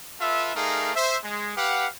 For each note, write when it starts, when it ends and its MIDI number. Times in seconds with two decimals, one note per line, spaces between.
0.21 0.55 65
0.21 0.55 69
0.21 0.55 71
0.21 0.55 76
0.56 0.92 57
0.56 0.92 63
0.56 0.92 68
0.56 0.92 70
0.56 0.92 77
0.96 1.18 72
0.96 1.18 76
1.24 1.55 56
1.57 1.87 67
1.57 1.87 71
1.57 1.87 77
1.57 1.87 78